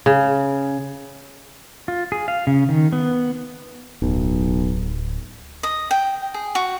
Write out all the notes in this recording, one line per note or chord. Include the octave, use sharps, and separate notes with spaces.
C#3
F4
G#4
F5
C#3
D#3
B3
D1 B1
D#5
G5
G#4
F#4